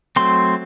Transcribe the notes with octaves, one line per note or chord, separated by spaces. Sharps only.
F#3 A3 C4 C6